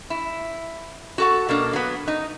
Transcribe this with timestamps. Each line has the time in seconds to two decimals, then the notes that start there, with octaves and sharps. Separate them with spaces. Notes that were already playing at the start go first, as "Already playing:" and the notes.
0.10 E4
1.18 F#4 A4 F#5
1.49 B2 A#3 D4
1.73 F#3 B3
2.08 D#4